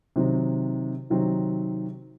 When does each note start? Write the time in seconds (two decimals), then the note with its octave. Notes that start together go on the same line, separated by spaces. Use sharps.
0.16 C3 D#3 F#3 C4 D#4
1.10 C3 D#3 F#3 C4 D#4